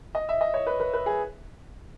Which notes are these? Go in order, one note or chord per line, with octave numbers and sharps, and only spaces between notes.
D#5
E5
D#5
C#5
B4
B4
B4
G#4